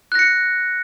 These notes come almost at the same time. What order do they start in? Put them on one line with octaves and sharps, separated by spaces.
F#6 A#6 C#7